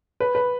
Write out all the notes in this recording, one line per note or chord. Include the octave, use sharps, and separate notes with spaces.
B4
B4